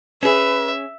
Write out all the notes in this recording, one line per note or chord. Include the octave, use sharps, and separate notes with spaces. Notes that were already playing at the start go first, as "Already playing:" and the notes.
C#4 G#4 B4 E5